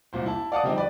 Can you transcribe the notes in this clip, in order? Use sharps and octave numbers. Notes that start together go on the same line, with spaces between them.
C2 A#2 C5
E4 A5
D5 F5 F#5 A5 D6 D#6
D3 F3 G3 C4 D#4
B4 D5 B5